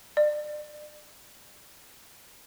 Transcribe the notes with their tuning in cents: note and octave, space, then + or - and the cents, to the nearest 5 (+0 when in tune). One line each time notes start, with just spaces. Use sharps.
D5 +30